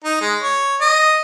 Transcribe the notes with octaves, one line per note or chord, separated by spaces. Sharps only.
D#4
G#3
C#5
D#5